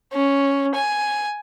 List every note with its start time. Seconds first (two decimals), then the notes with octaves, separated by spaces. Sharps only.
0.12 C#4
0.75 G#5